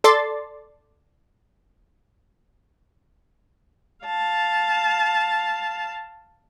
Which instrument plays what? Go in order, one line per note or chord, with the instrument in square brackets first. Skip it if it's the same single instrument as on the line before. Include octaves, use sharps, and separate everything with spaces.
[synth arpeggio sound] A4 D5 C6 A6
[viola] F5 A5